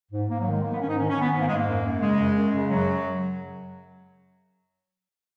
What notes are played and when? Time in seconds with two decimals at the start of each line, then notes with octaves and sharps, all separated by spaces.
0.11 G#2
0.28 G#2 A#3
0.39 F#3
0.45 D#3
0.51 G#3
0.63 D#3 A#3
0.71 B3
0.80 G#2 C#4
0.88 D#4
0.97 D#3 C#4
1.09 C#4
1.14 D#3
1.20 B3
1.32 G#2 B3
1.40 A#3
1.47 G#2 G#3
1.55 A#3
1.66 F#2
1.83 F#2
2.00 C#3 G#3
2.18 F#2
2.35 F#2
2.52 C#3
2.69 F#2 F#3